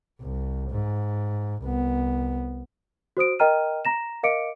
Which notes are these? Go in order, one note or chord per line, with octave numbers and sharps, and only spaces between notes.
C2
G#2
C2 B3
F#4 C5 D#6 D7
A#4 D#5 G5 A#5 F6 D#7
A#5 A#6 E7
A#4 D#5 F5 D6 C#7 D7